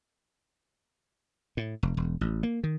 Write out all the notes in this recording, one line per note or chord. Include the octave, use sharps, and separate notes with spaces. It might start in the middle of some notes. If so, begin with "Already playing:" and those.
A2
F1
E1
A1
A#3
D#3